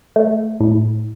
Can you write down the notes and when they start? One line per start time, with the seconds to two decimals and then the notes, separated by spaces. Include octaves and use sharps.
0.16 A3
0.60 A2